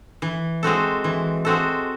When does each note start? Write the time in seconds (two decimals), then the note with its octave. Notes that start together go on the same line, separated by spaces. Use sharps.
0.22 E3
0.63 G#3 C4 F#4 A4
1.04 E3
1.45 G#3 C4 F#4 A4